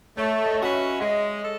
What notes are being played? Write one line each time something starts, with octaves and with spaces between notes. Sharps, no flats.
A3 C#5
D#5
C#5
C#4 F#4 B4 D#5
E5
G#3 D#5
A4